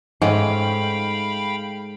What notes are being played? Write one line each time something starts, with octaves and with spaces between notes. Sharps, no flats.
G#2 G#3 A3 C#4 F5 G5 B5